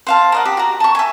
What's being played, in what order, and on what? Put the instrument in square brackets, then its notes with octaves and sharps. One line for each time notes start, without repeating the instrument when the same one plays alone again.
[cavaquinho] C5 F5 A5
A#4 D#5 F#5
G4
F#4 A#5
A5 C#6
E5 G#5